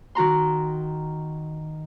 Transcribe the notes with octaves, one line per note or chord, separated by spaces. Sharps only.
D#3 F#4 A#5 C6